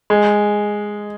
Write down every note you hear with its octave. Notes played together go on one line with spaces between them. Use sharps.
G#3